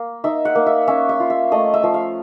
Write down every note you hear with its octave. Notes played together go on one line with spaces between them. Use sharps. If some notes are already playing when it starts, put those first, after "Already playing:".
Already playing: A#3
D#4 E5
F#5
A#3
E5
C#4 E5
E5
F4
E5
A3 D#5
E5
F3
F5